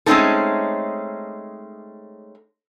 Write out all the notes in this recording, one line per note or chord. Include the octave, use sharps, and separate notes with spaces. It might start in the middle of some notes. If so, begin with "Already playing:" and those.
G#3 A3 C4 C#4 D#4 A4